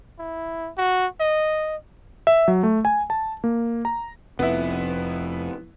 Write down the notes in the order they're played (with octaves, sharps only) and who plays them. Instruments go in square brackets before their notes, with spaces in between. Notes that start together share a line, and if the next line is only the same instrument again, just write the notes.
[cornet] E4
F#4
D#5
[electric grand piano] E5
F#3
A3
G#5
A5
A#3
A#5
[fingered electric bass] F1 F2 [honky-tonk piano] B3 E4